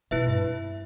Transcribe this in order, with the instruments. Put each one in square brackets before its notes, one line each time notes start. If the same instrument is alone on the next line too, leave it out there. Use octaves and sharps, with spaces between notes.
[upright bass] B2 [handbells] E4 B4 E5
[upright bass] G2